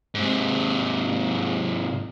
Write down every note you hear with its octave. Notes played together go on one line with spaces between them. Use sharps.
G#2 C3